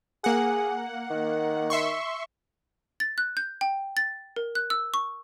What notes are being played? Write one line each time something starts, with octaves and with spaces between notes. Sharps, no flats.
A#3 G#4 F#5
D#3
E5 C6 C#6
A6
F#6
G6
G5
A6
A#4
F#6
E6
C#6